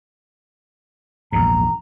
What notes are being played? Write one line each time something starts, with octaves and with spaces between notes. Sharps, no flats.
A#1 E2 G#2 A#5